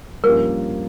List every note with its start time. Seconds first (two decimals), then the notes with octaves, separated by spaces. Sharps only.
0.24 G2 F3 A#3 C#4 G4 A#4